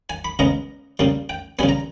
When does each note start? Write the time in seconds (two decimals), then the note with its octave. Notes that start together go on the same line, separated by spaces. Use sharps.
0.10 G#5
0.25 B5
0.39 C#3 G#3 B3 A#5
0.99 C#3 G3 A#3
1.29 G5
1.59 C#3 G3 B3 G#5
1.69 A#5